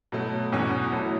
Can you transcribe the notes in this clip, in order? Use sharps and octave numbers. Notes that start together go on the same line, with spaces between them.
B2 F#3 A3
E2 B2 F#3 C#4 F#4
F#3 A3 E4 A4